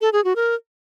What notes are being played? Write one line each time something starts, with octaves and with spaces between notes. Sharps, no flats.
A4
G#4
F#4
A#4